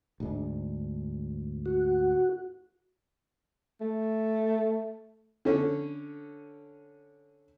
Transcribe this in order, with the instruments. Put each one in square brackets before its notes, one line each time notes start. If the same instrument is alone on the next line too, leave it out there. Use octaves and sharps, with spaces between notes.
[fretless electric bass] D2 G#2 D4
[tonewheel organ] F#4
[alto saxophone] A3
[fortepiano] D3 C#4